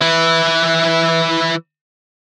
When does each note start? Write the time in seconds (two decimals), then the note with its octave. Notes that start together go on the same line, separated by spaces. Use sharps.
0.01 E3 E4